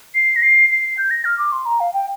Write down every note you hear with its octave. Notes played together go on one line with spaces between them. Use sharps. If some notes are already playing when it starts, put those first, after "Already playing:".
C7
A#6
C7
C7
G6
A#6
F6
D6
C6
A#5
F5
G5